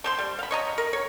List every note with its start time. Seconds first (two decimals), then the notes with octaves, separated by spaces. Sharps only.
0.04 A3 C5 C6
0.18 G3
0.39 F5 B5
0.51 C#5 D#5 A#5
0.78 A#4
0.93 C#5